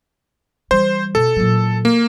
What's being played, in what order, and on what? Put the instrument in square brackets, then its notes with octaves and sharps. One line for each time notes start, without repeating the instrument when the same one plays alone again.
[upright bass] E3 G3 [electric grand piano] C5
[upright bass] B2 [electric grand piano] A4
[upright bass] A#2 F#3
[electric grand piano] A#3